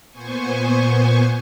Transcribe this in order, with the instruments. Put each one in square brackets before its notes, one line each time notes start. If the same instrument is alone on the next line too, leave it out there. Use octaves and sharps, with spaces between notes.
[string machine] A#2 B3 C5 G#5 C#6